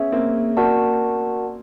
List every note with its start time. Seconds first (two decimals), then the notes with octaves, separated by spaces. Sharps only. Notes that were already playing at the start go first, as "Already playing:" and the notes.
Already playing: B3 C#4 G#4 C#5 E5
0.12 A#3 C4
0.57 F#4 A#4 D5 F#5 A5